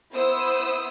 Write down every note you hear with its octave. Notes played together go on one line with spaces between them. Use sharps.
B3 E4 C5 D#6 E6